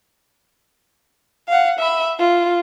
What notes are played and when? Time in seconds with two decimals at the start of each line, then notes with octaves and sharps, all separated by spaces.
1.49 F5 F#5
1.79 E5 B5
2.19 F4